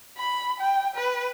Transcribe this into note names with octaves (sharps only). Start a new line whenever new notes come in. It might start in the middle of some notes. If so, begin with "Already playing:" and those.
B5
G5
B4